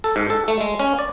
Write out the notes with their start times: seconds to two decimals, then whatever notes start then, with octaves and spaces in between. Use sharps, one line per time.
0.04 A4
0.16 G#2
0.30 A4
0.48 A3
0.61 G#3
0.79 C#4
0.99 D5